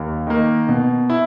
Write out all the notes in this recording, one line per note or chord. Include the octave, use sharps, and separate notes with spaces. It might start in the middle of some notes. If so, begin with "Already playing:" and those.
Already playing: D#2
D#3 A#3
B2
E4